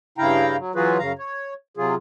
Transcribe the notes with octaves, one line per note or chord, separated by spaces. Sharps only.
G2 C#3 E4 F5 G5 A#5
F#3
E3 F#3 F4 F#4 G#4 B4
F#2 C#3 F5 A#5
C#5
C3 F#3 F4 G#4